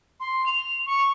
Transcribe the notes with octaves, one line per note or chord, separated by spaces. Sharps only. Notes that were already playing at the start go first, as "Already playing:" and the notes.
C6
F7
C#6